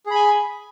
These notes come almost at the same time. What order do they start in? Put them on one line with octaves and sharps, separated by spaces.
G#4 B5 G#5